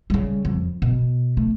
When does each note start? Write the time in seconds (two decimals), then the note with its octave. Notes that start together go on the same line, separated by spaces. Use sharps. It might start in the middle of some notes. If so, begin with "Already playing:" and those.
0.10 C#3 G3
0.45 F2
0.82 B2
1.37 A3